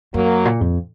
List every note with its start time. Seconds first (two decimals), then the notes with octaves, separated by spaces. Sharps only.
0.14 F#2 F#3 A#3
0.45 A#2
0.61 F2